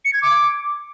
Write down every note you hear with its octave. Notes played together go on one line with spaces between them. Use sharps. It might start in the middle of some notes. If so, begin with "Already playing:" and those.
C#7
G#6
D6